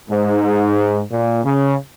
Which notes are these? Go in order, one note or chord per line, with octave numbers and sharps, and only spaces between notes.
G#2
A#2
C#3